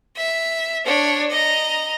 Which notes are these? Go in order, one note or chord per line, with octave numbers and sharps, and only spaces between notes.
E5
D4 C#5
D#5 A#5